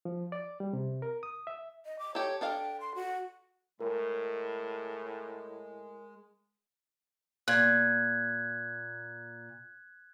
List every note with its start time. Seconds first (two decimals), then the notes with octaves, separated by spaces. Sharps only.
0.05 F3
0.32 D5
0.60 G3
0.73 C3
1.02 A#4
1.23 D#6
1.47 E5
1.85 D#5
1.99 D6
2.15 G4 A4 C#5
2.41 D4 A4 F5 G5
2.80 C6
2.95 F#4
3.81 A2 G#3 A#4
7.48 A#2 F#6 G#6